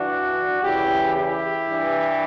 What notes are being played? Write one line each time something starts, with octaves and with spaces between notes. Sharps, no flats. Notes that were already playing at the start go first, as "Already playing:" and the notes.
Already playing: G2 E3 D4 F#4
E2 C#3 E3 E4 G4
E4 G4
G2 E3